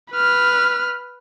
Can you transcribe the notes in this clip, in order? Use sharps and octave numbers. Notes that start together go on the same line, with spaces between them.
B4 F6